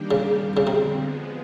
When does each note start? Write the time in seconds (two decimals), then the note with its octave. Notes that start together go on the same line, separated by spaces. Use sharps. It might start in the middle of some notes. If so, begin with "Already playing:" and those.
Already playing: D#3 G3 A#3 D4 G4
0.11 C#3
0.39 F2 D3 G3 C4
0.57 C#3
0.67 C3
0.96 F3 G#3 B3